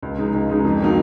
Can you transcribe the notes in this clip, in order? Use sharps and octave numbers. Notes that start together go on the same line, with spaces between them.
C#2
C#3 G#3 D#4
C#2
C#3 G#3 D#4
F2
D#3 F#3 A#3 D#4